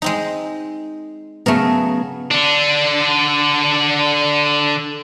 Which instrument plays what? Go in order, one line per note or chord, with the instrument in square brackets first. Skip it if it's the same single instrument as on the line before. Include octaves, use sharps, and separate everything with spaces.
[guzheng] G#3 C4 D#4
[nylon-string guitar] C#3 F#3 B3 [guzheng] A3 A#4
[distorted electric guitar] D3 D4